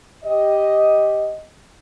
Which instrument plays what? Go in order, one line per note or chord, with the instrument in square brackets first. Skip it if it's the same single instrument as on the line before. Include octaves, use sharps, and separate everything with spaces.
[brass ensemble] G4 D#5